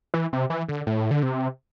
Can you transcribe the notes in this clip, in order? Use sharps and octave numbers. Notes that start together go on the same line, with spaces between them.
E3
C3
E3
D3
A2
D3
C3